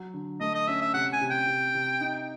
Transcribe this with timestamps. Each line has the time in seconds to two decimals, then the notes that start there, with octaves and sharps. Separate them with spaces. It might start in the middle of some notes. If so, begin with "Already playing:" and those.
Already playing: F#3
0.14 D3
0.40 A3 D#5
0.55 D#5
0.67 C#4 E5
0.81 E5
0.94 C3 F#5
1.13 G#5
1.21 C3
1.31 G5
1.47 C3
1.75 C3
2.01 D#4